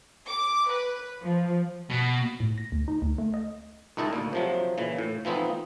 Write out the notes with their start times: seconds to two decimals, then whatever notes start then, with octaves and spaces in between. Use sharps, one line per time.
0.28 D6
0.69 B4
1.22 F3
1.90 B2
2.40 A2
2.58 A#6
2.72 D2
2.88 D#4
3.02 D2
3.18 A3
3.34 D#5
3.97 C#2 D#3 E4 D#5 A5
4.13 D2 A#2
4.33 C3 F3 F#3
4.78 A#2 C#3 E3
4.98 A2
5.25 E3 F3 B3 C4 D#4